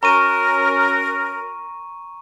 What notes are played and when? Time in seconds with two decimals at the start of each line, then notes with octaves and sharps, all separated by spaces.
0.03 C#4 F#4 A#4 A#5 C#6 D#7